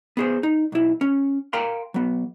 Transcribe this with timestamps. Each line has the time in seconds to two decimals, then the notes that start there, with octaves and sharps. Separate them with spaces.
0.17 B3 G#4 C5
0.43 D#4
0.72 B1 E4
1.01 C#4
1.53 A#4 F5 G5 A#5 C6
1.94 F#3 B3